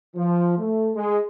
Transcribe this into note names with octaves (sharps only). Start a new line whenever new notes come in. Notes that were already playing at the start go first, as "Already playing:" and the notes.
F3
A3
G#3